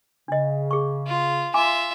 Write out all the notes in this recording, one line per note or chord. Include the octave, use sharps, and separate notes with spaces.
C#3 D4 D#5
G#4 C#6
F4
F4 E5 G#5 C6 D6